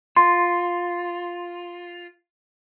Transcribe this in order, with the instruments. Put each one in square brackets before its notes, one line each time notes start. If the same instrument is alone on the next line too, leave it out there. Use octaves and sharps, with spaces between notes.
[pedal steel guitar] F4 [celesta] C6